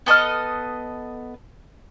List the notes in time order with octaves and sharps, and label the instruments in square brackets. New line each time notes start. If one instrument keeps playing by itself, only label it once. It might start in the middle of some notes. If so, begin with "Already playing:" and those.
[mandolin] B3 A4 D#5 F6